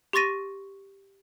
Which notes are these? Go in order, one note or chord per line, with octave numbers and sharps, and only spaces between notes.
G4 C6 C#6 A6 A#6 D#7